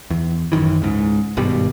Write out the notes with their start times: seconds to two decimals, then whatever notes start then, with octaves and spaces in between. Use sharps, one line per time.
0.10 E2
0.52 A1 F#2 D#3 E3
0.82 C#2 G#2
1.37 G#1 G2 B2 G3